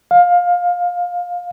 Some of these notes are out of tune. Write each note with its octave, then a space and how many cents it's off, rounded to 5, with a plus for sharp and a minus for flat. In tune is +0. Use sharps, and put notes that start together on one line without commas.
F5 +20